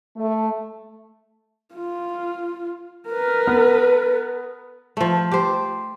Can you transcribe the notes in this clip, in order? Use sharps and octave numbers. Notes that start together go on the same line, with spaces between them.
A3
F4
A#4 B4
B3
F3 A3
G4 C5